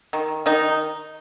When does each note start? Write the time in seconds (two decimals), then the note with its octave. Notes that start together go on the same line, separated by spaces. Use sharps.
0.13 D#3
0.46 D#3 D#4